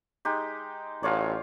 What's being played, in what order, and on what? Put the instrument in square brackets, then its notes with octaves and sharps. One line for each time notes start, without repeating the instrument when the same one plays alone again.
[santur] G#3 D#4 G4
[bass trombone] A1 [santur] F4 C#5 D5